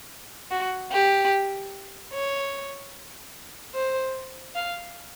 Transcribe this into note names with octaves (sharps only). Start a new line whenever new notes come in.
F#4
G4
C#5
C5
F5